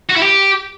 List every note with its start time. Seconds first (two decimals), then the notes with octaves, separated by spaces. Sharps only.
0.09 F#4
0.16 E4
0.22 G4